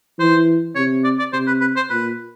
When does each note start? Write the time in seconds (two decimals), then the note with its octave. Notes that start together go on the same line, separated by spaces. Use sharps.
0.19 E3 C5
0.75 C3 C#5
1.04 D5
1.19 D5
1.33 C3 C5
1.47 B4
1.61 B4
1.76 C5
1.90 A#2 B4